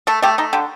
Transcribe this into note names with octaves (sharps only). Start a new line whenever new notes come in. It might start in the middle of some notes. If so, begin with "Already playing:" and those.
A3 A4
A3 G4
A3 D#4
D3 G4